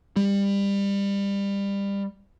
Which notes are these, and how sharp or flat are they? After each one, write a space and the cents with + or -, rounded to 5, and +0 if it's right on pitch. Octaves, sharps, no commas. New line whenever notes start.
G3 +25